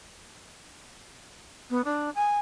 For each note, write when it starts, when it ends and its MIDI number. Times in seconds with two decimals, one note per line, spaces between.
1.70 1.81 59
1.84 2.10 62
2.15 2.39 80